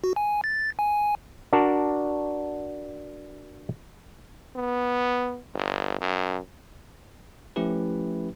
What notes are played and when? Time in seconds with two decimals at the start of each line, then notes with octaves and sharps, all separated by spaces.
0.04 F#4
0.16 G#5
0.44 A6
0.79 G#5
1.53 D4 F#4 A#4 D5 A5
4.55 B3
5.54 G1
6.00 F#2
7.56 F3 A3 C#4 E4 G4 B4